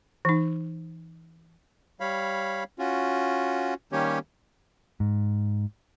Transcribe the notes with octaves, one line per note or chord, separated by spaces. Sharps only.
E3 D#4
G3 C#5 F5 B5
C#4 F4 F#4
D#3 G3 A#3 C#4 G4 C#5
G#2